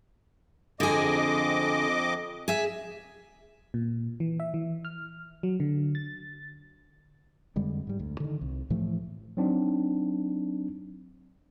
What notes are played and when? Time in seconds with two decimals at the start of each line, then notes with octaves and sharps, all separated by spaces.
0.80 F2 D3 G#4 D#5 D6
2.48 G#4 E5
3.74 A#2
4.20 E3
4.40 E5
4.54 E3
4.85 F6
5.43 F#3
5.60 D3
5.95 A6
7.56 F2 D3 G3 G#3
7.87 G#2 G3
7.99 D2
8.20 D3 D#3
8.41 C2
8.70 A2 E3 F3 A3
9.37 F#3 C4 D4 D#4